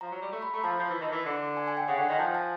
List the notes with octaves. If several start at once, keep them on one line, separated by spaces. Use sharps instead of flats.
F3 A#5
F#3
G3
A3
B5
A3 A#5
F3 A5
F3
E3
D#3
E3
D3
G#5
G#5
G5
C#3 F#5
D3 F#5
D#3 G#5
F3 A5
A5